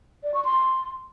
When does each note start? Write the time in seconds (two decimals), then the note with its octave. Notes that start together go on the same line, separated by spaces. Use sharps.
0.24 D5
0.34 C#6
0.45 C6